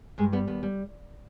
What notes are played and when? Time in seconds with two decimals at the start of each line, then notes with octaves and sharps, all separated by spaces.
0.18 G2 G#3
0.33 G3 B3
0.47 D#2 B3
0.63 G3